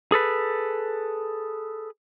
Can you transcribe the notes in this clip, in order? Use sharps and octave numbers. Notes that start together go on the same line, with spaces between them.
G#4 A4 B4